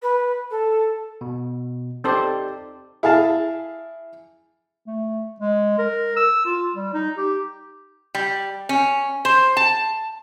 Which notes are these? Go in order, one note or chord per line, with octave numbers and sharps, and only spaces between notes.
B4
A4
B2
C4 D#4 G4 A4 C5 D5
E4 G#4 F5 A5
A3
G#3
A#4
E6
F4
G3
D#4
G4
G3
C#4
C5
A5